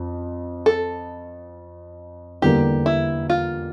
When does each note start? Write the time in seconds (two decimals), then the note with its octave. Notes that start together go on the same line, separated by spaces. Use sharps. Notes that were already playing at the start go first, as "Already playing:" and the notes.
Already playing: F2
0.66 A4
2.42 E2 D3 G3 A#3 G4
2.86 E4
3.30 F4